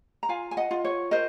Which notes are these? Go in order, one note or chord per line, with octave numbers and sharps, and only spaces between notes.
A#5
F4 F5 G#5
G#5
D#5 F#5
F4
C#5
A#4 C5 D#5